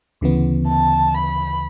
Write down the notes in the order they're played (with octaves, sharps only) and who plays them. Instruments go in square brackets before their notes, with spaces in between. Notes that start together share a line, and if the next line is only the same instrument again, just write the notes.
[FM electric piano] D2 C#3 E3 B3
[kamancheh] A5
B5